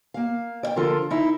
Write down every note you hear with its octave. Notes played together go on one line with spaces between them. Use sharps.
A#3 F5
D5 G5
D3 F3 F4 A4 A#4
D#4 E4